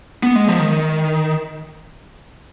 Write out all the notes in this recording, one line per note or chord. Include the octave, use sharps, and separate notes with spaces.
B3
G#3
F3
D#3